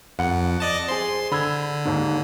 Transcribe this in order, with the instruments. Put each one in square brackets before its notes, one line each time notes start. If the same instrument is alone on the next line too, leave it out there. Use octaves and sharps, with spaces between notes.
[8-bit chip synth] F2 [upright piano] F#5
[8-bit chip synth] D5 D#5 A5
[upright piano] G#4 C5 [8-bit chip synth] C6
[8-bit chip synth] D3 [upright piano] B5 E6 G#6
[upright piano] D#2 G#2